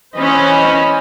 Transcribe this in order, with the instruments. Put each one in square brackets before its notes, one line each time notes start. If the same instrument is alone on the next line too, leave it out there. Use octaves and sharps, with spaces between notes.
[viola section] E3 C#4 C5 D#5 B5